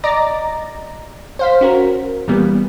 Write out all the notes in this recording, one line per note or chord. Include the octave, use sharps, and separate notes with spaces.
D5 D#5 A#5 D6 A6 A#6
C5 F5 B6
C#4 F#4 A#4
A#2 E3 G3 B3